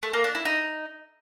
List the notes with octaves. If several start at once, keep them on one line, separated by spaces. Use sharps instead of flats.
A3
A#3
D4
E4
D#4